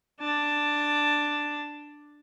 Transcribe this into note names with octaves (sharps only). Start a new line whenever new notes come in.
D4 A5